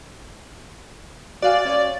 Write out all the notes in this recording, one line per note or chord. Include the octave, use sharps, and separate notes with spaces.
F#4 D5 F5 G#5
C#4 C#5